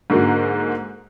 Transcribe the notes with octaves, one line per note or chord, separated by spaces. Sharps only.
G#2 D3 A#3 F#4